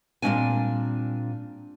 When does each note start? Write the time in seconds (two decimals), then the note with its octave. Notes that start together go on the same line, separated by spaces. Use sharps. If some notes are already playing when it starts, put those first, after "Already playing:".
0.22 A#2 G3 A#3 C4 D4 G#5